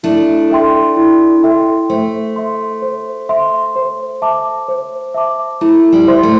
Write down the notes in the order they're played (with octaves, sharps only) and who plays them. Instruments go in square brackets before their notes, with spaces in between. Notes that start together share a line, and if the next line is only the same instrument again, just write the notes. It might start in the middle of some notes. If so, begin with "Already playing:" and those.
[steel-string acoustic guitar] A3 D4 [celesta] E4
[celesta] A4 E5 G5 C6
E4
A4 E5 G5 C6
[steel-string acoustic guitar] A3 [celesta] C5
[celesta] E5 C6
C5
E5 C6
C5
E5 A5 D6
C5
E5 A5 D6
[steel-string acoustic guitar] A3 [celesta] E4
[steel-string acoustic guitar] G3
[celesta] C5 E5 C6
[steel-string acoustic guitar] A3